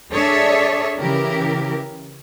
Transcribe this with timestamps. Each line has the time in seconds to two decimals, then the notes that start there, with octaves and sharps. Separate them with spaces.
0.12 D4 G#4 A4 C#5 D5 E5
0.99 C#3 E3 E4 G4 A#4